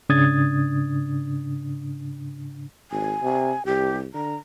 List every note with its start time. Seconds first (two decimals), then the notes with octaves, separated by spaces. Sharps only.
0.09 G#2 C#3 D4 D#6 G#6 A6
2.91 G#1 G#5
3.22 C3
3.66 C2 G4
4.14 D3 A#5